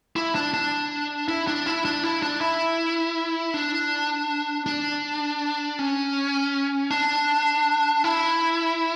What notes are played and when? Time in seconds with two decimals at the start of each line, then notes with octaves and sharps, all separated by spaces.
0.16 E4
0.35 D4
0.54 D4
1.28 E4
1.47 D4
1.66 E4
1.85 D4
2.04 E4
2.23 D4
2.41 E4
3.54 D4
4.66 D4
5.79 C#4
6.91 D4
8.04 E4